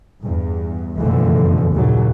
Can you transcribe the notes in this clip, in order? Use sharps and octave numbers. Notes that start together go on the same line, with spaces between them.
E2 G2
F#1 F2 B2 D3 E3 A3
D#2 A#2 C#3 F#3